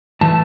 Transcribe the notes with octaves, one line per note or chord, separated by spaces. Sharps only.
A2 E3 A3 A5